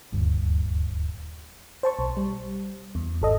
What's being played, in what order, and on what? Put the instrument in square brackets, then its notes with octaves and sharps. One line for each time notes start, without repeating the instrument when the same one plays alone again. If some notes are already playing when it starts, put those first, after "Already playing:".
[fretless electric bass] D#1 D2 G2
[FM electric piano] C5 A5 C#6
B1
G3
E2
G#1 A4 D#5